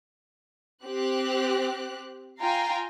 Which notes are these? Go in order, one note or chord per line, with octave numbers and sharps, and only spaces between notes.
C4 G4 F#6
F4 F5 G5 G#5 A#5